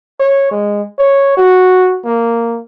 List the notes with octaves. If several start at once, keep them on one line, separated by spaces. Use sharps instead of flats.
C#5
G#3
C#5
F#4
A#3